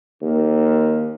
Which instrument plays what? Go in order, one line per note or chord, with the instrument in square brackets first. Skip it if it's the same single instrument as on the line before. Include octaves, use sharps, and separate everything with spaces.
[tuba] D#2